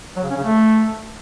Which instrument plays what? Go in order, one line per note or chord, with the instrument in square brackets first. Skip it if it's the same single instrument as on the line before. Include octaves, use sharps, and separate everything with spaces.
[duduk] F#3
C#3
C#4
C#3
A3